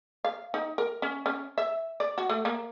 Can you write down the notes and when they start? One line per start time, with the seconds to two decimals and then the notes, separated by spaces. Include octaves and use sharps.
0.24 F5
0.54 D#4
0.78 A#4
1.02 C#4
1.26 C#4
1.58 E5
2.00 D5
2.18 F#4
2.30 A3
2.45 A#3